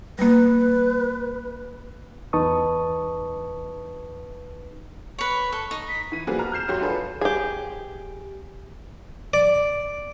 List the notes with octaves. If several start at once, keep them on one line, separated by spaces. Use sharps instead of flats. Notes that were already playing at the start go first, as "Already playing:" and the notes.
G3 A#3 B4
E2 D#4 B4 A5 C#6 D#6
B4 C#5 C#6
A4
D#4
B6
E3 D#7
F3 G3 A#3 F#4 G#4 B4
A5 A#5 F6
F6 G6 C7 E7
F#2 F#3 F#4 G4 C6
D4 F4 G#4 A4 B4
G4 G#4
D5